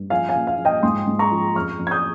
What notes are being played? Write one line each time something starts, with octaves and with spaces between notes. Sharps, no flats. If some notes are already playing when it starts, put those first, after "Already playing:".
Already playing: G2
F3 F5 G#5
F5 G#5
A#2
F5
F3
D#5 G5
G#2 C6 D#6
G#2
A#5 C#6
F3
F2 C#6 F6
F2
G#6
D#6 G6